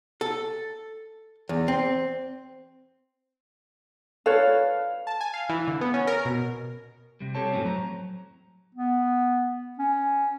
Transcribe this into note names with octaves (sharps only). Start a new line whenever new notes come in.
A4
E2
C4
A4 B4 C#5 F5
A5
G#5
F5
E3
D3
B3
C#4
A#4
B2
C3 G3
C4 G4 A4 C#5 A5
F2 A2 D3 F#3 C4 C#4
F#3 A#5
B3
C#4